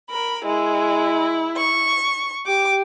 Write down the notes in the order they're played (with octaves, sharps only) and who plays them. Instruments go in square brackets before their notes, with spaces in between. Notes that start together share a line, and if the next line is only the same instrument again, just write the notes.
[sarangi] A#4 [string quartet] B5
[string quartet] G#3 [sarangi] E4
[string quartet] C#6
[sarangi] G4 [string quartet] D6